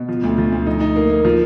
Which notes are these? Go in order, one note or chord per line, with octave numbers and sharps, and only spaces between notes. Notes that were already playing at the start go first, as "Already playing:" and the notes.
Already playing: B2
F3
D2
F3
D2
D#4
D#4
A#3
A#3
F3